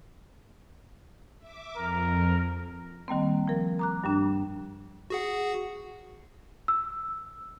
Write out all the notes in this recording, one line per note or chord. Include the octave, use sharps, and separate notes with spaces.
E5 D6
F2 A#4
D#3 G3 A#3 C4
F3 A#4
A#5 D6 F#6
G2 G3 D4
F#4 G#4 F#5
E6